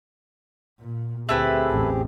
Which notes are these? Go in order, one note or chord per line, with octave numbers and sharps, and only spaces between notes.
A#2
D2 A3 C4 E4 G4 G#4 B4
A1 E2